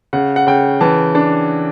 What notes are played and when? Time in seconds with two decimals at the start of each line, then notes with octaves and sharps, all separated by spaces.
0.13 C#3 F#5
0.36 F#5
0.47 C#3 G5
0.81 E3 A5
1.15 D4